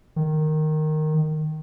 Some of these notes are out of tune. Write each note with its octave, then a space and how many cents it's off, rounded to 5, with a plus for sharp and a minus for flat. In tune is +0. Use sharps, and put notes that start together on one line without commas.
D#3 -10